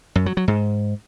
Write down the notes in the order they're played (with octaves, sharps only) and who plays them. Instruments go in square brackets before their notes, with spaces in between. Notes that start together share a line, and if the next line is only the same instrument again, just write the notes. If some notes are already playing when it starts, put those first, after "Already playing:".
[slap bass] F#2
F#3
F#3
G#2